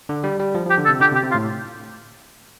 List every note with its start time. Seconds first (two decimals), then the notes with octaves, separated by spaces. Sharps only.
0.09 D3
0.24 G3
0.40 G3
0.55 F3
0.66 F3 G4
0.78 D3
0.85 A4
0.89 C3
1.00 D3 G4
1.12 C3
1.15 G4
1.23 C3
1.31 F4
1.35 A2